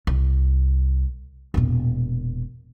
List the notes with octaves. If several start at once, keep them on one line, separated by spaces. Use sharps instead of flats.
C2
E1 A#2